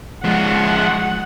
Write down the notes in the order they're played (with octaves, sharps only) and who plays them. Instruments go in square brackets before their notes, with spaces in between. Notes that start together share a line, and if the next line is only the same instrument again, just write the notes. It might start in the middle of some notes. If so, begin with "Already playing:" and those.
[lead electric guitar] F3 G#3 [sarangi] F#5